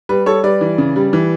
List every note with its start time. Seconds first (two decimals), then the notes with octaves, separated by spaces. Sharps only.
0.09 G3 B4
0.26 G3 A4 C#5
0.43 G3 B4 D5
0.61 E3
0.78 C#3
0.96 G3
1.13 E3